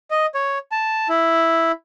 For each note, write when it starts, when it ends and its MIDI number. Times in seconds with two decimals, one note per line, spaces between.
0.11 0.26 75
0.34 0.58 73
0.72 1.08 81
1.09 1.72 64